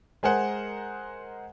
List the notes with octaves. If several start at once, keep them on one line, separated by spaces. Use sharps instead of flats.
G#3 G#4 A#4 C5 F#5